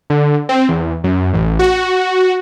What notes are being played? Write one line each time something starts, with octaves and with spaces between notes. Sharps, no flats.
D3
C4
E2
F#2
A1
F#4